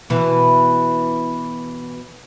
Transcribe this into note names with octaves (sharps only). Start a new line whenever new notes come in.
B2 E3